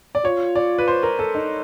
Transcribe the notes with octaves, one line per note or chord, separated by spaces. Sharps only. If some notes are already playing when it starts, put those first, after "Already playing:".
D5
F4 C#5
D5
B4
C5
A#4
A4
D#4